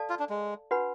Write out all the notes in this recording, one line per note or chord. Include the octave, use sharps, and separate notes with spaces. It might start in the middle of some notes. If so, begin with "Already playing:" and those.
Already playing: A4 D5 F5 A5
F4
D4
G#3
D4 F#4 B4 F#5 B5